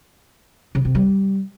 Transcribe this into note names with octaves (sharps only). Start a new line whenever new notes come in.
C#3
C3
G3